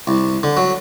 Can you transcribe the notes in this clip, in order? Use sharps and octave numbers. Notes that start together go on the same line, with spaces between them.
C2
D3
F#3